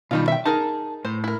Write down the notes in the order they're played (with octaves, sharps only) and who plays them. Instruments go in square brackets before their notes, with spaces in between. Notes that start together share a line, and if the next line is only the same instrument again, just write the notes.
[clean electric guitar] B2 D#3 [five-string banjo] G3 D#4 F4
[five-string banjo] E5 G5
[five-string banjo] D#4 G#4 A#4 [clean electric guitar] A5
[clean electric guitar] A2 [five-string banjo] C5
[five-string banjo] E4 A#4